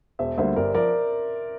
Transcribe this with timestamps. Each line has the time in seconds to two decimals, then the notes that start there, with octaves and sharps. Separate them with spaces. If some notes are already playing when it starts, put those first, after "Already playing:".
0.19 E1 C5 E5
0.37 D2 D3 G3 A#3 C5 E5
0.56 G1 A#4 D5
0.74 F3 A#4 D5